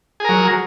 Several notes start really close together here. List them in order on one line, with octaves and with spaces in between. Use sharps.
G#4 A#4 F#3